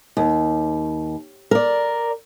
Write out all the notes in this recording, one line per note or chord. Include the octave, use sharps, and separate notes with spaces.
D#2
A#4 D5